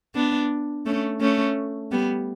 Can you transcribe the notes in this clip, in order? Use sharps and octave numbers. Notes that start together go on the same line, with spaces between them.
B3 D4
A3 C#4
A3 C#4
G3 B3